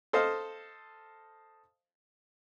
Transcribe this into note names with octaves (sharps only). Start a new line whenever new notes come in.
A4 C5 D#5 F5